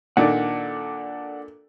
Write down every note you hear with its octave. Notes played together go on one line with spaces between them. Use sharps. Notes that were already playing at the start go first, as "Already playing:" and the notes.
A#2 D#3 D4 A4 D5 F#5